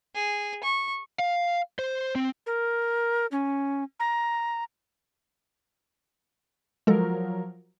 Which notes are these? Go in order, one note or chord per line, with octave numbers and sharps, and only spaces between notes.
G#4
C#6
F5
C5
C4
A#4
C#4
A#5
F3 F#3 G#3 A4 A#4